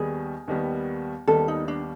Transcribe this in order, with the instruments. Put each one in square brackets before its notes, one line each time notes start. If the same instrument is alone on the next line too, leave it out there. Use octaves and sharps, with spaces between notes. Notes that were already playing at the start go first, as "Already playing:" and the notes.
Already playing: [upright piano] D#2 D#3 G3 B3 [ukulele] G#4
[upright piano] D#2 D#3 G3 B3
[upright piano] D#2 D#3 G3 B3 [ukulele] A4
[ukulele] D#4
D4